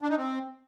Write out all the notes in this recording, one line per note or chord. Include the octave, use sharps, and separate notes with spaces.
D4
D#4
C4